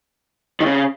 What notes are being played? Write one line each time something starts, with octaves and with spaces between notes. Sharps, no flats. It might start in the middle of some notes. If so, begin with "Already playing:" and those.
D#3
C#3